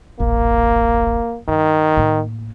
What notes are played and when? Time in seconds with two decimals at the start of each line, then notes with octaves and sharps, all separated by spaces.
0.20 D#1 A1 A#3
1.48 G2 D#3
1.97 A2 A#3